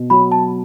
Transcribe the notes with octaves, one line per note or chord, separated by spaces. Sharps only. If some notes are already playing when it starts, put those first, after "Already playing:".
Already playing: B2
F#3 B5
A5